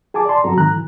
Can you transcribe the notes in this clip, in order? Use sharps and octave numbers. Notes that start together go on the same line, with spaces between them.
G#4 G#5 A5 D6
D5 A5 C6
G2 F#3 C4 F#4 A4 A#5
G#2 D#3 A#5 F#6
E3